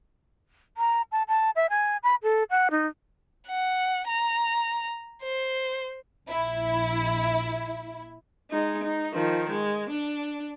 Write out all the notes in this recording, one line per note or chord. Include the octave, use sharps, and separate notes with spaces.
A#5
A5
A5
E5
G#5
B5
A4
F#5
D#4
F#5
A#5
C5
A#1 E4
G#3 D#4
D#4
D#3 F3
G#3
D4